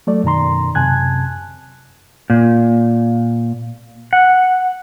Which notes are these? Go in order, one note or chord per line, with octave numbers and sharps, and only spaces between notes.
F#3 A3 D5
F#2 B2 D#3 A#5 C6
F#2 C3 G#5 A5 F#6 G#6
A#2
F#5